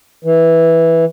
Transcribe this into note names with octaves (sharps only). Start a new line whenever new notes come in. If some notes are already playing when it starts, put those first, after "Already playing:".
E3